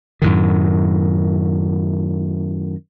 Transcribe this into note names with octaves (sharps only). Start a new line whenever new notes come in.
F#2 A2 D#3